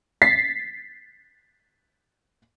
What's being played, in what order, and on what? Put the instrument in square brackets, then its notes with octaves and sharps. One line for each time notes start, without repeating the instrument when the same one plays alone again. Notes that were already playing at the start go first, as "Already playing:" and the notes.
[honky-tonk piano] A6 B6 C7